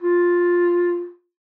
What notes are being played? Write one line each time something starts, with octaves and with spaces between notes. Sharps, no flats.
F4